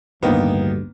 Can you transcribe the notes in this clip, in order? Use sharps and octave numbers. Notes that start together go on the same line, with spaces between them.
A1 D2 G2 D#3 A#3 B3